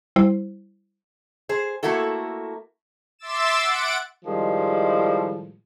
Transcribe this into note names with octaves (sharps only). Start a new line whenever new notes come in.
G3 E4 C5
G#4 C5
A3 A#3 E4 F#4 A4
E5 C6 D6 E6 A6 E7
F#5 D7
A2 D#3 F3 G3 G#3